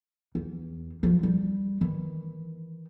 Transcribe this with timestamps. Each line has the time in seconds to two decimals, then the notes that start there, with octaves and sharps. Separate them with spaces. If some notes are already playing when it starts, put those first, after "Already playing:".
0.35 E2
1.03 F#2 F3
1.23 G3
1.81 D#3 E3